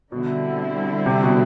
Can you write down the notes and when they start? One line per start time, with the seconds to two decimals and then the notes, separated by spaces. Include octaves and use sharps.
0.12 B2 D3 G3 C4 E4
1.06 C3
1.23 B2